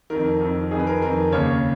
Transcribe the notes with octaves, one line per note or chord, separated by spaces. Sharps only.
F2 D#3 A#4
F2 D#3
F2 D#3 G#4
B4
A#4
F2 D#3 A#4
D#2 C#3 C#5